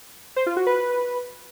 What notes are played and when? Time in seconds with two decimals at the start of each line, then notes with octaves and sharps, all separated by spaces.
0.36 C5
0.46 F4
0.57 F#4
0.67 B4